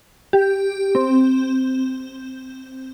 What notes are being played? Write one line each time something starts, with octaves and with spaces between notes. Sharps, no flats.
G4
C4